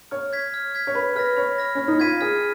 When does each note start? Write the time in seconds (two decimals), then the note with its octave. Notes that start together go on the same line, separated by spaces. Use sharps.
0.11 C#5 F6
0.33 G#6 B6
0.54 F6
0.75 G#6 B6
0.87 C#5
0.95 B4 B5
1.16 B4 F6 A#6
1.37 C#5 B5
1.58 F6 A#6
1.75 C#4 F6
1.88 D#4
2.00 F4 G#6 B6 D#7
2.21 G#4 F6